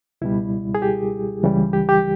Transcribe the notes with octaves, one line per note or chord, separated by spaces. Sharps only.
C#2 B2 G3 E4
G#4
G4
C#2 C#3 E3 G3
G4
G4